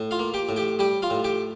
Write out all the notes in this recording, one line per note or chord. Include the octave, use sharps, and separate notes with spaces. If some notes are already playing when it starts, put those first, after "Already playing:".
Already playing: A2
F4 F5
A#3
G4 G5
A2
G4 G5
G3 G4 G5
F4 F5
A2
G4 G5